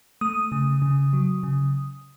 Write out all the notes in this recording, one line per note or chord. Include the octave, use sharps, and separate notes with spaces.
A3 D#6
C#3
C#3
F#3
C#3